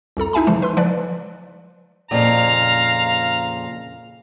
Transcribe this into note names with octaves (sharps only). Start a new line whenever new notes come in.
C2 F2 A4 A#5
D#4 E4 E5 G#5 A5 B5
C#3 E3 F3 G#3
B4 C6 E6
F3 B4 D5
F2 A#2 C#3 F5 A#5